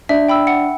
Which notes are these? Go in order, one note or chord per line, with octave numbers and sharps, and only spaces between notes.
D4 E5
G5 B5 E6
F#5